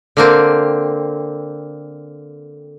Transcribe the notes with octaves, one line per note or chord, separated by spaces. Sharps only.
D3 A#3 C4